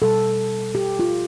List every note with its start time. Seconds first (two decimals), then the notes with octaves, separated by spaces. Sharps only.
0.02 B2 G3 A4
0.75 G4
0.99 F4